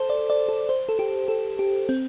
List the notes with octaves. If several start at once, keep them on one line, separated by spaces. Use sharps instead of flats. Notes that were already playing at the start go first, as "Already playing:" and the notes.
Already playing: A4 C5
D5
D5
A4
C5
A4
G4
A4
G4
C4